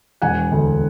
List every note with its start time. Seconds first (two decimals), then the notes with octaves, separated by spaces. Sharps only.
0.22 E1 F#5 G#5
0.51 D2